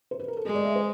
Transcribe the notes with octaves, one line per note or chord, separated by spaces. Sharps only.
C5
B4
A#4
A4
G#3 G#4
D5
E5
C5